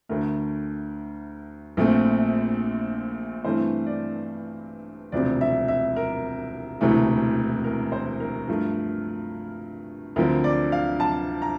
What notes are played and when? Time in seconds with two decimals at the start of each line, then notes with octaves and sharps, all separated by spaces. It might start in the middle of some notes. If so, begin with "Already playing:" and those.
0.09 D2 D3 A3 A#4
1.77 A#1 A#2 A3 C4
3.45 G2 E3 A3 C4 C5
3.86 D5
5.12 E1 D2 C3 F3 C4 D5
5.41 E5
5.68 E5
5.96 A#4
6.81 E1 D2 C3 E3 A3
7.64 A#4
7.92 C5
8.20 A#4
8.48 G2 F3 A3
10.16 D2 D3 F3 C4 A#4
10.44 D5
10.72 F5
11.00 A5
11.42 A#5